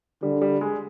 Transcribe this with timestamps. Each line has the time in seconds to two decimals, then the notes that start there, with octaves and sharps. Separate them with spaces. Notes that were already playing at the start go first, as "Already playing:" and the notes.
0.22 D3 G3
0.41 G3
0.61 G#3